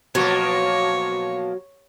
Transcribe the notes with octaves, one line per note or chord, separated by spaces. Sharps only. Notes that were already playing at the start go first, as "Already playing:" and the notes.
B2 F3 F#3 A#3 C#5